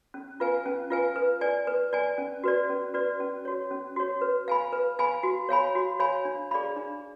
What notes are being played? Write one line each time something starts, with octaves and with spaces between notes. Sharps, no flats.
C#4
F4 B4 F5 G#5
C#4
F4 B4 F5 G#5
B4
D5 G#5
B4
D5 G#5
C#4
F#4 B4 D5
C#4
F#4 B4 D5
C#4
F#4 C#5
C#4
F#4 C#5
B4
F5 G#5 B5
B4
F5 G#5 B5
F#4
C#5 F5 G#5 B5
F#4
C#5 F5 G#5 B5
D4
G#4 D5 F5 B5
D4